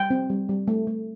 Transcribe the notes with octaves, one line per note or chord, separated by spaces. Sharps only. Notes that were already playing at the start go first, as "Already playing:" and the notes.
Already playing: G3 G5
C4
G3
G3
A3
A3